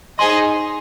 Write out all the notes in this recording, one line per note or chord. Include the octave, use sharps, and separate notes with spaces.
D#4 G#4 C5 D#5 C6